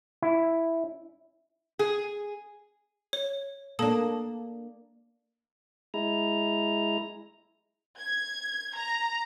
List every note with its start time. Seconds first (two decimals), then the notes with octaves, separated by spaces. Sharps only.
0.22 E4
1.79 G#4
3.13 C#5
3.79 A#3 D4 A4 A5 D#6
5.94 G#3 E4 A#5
8.00 G#6
8.77 A#5